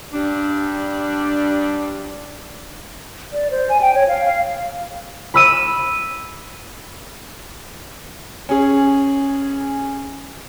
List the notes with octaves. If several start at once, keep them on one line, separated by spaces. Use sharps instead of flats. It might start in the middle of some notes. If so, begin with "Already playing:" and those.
G2 G3 D4
D5
C5
G#5
G5
C#5
F5
F5
B5 E6 D#7
C#4 G#4